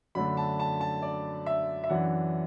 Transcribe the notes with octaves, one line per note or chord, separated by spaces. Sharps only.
F#2 D3 A3 D4 B5
A5
A5
A5
D5
E5
E5
F#2 E3 D4 F#5